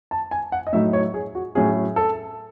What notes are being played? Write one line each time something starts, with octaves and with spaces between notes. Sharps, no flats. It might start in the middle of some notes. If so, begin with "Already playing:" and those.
A5
G#5
F#5
D#5
A2 F#3 A3 D#4 E5
C#5
G#4
F#4
A2 F#3 C#4 G#4
A4